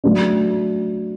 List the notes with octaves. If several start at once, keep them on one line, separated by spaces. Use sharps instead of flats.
F#3 A3 D4